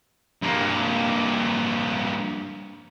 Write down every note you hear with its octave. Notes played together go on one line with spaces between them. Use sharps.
G2 A#3